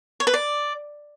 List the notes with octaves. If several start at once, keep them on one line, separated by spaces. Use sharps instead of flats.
C#5
B4
D5